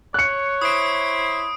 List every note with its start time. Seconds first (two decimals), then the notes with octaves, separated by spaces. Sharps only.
0.14 C#5 F#6 C#7
0.62 E4 C5 E5 D#6 D7